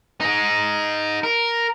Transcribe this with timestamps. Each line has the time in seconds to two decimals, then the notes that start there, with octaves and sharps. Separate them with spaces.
0.21 D#4 G#4
1.23 A#4